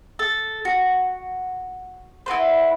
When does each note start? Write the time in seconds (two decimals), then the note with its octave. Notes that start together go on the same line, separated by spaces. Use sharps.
0.19 A4
0.65 F#4
2.26 E4 F#4 B4 C5